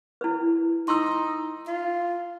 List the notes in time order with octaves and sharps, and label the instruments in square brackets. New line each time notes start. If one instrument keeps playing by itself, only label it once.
[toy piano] E4 B4
[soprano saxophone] D#4 [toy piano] C6 E6
[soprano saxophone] F4